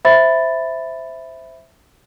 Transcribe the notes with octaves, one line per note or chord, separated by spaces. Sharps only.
C5 E5 B5 A6